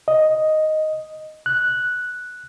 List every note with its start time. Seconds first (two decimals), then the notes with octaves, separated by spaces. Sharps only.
0.08 D#5
1.46 F#6